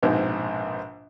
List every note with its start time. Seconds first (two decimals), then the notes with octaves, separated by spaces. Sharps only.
0.03 A#1 G#2 B2 C4